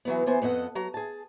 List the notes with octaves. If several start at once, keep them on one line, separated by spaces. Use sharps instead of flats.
E3 F#3 B3
E3 B3 C5 G#5
F2 B3 A4 D#5 F#5
F#3 A#5
G#4 A5